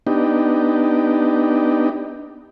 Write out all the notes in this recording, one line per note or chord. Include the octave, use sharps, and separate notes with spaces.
B3 D4 D#4 G4